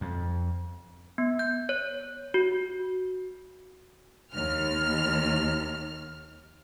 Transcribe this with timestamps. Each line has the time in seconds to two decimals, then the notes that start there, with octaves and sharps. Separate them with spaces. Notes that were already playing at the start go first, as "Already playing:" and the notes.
0.01 F2
1.18 B3
1.39 G6
1.69 C#5
2.34 F#4
4.33 D#2 F6